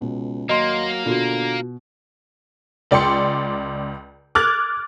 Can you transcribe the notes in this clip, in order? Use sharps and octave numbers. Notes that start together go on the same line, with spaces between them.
C#2 B2
D#2 F#3 A#3 D#5 C6
B2 D3 F4 F#4
C#2 D5 G5 C6 C#7
D6 F6 F#6 G#6 A6